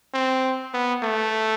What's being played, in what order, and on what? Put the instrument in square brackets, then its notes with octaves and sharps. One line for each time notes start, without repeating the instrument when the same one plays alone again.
[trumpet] C4
B3
A3